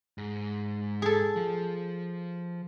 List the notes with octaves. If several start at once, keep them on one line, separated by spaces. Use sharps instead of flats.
G#2
G#4 A4
F3